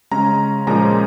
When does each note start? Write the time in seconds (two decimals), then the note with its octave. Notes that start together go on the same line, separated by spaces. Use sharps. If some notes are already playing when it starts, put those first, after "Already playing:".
0.11 C#3 G#3 C#4 A#5
0.67 A#2 F3 G#3 C#4 A#5